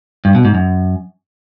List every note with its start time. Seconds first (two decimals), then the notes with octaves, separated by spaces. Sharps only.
0.25 G2
0.35 B2
0.45 G#2
0.55 F#2